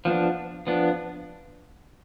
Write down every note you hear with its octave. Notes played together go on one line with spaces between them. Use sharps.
F3 B3 D4
F3 B3 D4